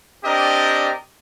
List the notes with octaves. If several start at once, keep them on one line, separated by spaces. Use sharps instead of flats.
C4 D4 G4 A#4 D5 D#5